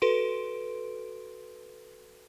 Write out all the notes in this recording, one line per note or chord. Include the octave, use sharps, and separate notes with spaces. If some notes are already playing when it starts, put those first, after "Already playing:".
F#4 A4 B4 C6 D7